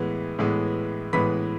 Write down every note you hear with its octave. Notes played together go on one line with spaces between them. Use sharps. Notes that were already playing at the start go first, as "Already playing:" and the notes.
Already playing: A2 E3 G#3 B3
A2 E3 G#3 B3
A2 E3 G#3 B3 B5 B6